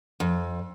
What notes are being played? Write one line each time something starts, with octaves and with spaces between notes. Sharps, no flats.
F2